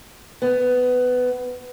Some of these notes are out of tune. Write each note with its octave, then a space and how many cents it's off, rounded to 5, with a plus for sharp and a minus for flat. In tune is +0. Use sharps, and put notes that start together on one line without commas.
B3 +15